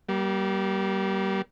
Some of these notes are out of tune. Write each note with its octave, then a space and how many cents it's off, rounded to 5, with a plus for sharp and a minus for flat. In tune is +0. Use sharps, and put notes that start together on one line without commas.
G3 -20 A#3 +30